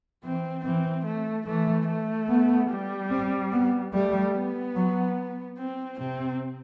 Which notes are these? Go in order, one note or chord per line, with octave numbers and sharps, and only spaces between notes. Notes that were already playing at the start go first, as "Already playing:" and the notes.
E3 C4
E3 C4
A3
E3 A3
A3
B3
G3
C4
B3
G3 A3
B3
F#3
C4
C3 C4